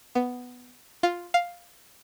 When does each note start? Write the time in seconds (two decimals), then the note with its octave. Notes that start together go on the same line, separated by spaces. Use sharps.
0.15 B3
1.03 F4
1.34 F5